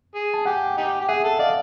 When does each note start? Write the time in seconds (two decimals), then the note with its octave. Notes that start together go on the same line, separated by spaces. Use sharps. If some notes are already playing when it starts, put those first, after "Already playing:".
0.14 G#4
0.34 A5
0.46 G4 F#5 G#5
0.77 D#4 G4
1.01 G4
1.08 G#4 E5 F#5
1.24 A4
1.39 D5 D#5 F5